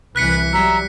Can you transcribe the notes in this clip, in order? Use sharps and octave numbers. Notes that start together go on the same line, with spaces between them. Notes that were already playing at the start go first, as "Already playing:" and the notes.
C2 E3 B4 F#6 B6 C#7
F#3 G3 E5 A#5